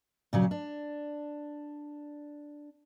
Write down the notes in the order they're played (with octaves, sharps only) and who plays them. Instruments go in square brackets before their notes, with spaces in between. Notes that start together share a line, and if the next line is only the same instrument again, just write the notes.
[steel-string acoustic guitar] A#2 C#3 F#3
D4